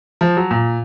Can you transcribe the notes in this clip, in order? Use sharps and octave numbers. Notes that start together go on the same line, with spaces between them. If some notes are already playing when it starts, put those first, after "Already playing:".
F3
F#3
A#2